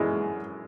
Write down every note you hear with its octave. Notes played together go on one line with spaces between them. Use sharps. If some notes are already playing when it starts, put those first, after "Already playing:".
Already playing: F#2 E3 G#3